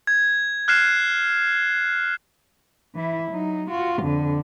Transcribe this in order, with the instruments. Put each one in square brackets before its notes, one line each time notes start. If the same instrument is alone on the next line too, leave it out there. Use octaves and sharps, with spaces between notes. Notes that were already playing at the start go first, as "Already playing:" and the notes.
[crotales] G#6
F6 F#6 G#6 C7 E7
[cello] E3 E4
F#3 D#4
F4 F#4
F2 D3